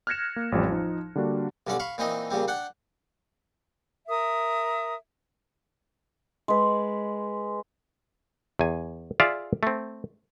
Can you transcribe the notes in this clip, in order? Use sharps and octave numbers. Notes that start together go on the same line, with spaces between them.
F6 F#6 G#6 A#6 C#7 E7
A#3
A1 F2 F3 G3
F3 D#4
D3 G3 A#3 D4 F#4
B1 G2 D3 C#4 D5 D6
F5 B5 C#6
A#2 E3 C4 D#4 D#5
A#2 C#3 G3 C4
D4 F#5 G5
A#4 E5 D#6
G#3 B4
E2 G#5
F4 G#4 D5 E5 F5
A3 C4